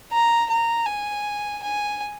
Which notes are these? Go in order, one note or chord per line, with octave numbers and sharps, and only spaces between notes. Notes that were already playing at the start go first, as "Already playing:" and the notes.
A#5
A#5
G#5
G#5